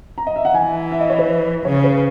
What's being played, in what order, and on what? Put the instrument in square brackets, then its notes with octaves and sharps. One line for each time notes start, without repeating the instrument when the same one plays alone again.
[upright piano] A#5
D#5
E5
F#5
[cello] E3 [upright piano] G#5
[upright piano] E5
D#5
C#5
B4
[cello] C#3 [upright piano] C#5
[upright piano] B4